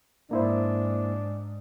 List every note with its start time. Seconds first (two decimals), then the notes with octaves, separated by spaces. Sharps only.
0.31 G#2 A#3 D4 E4 C5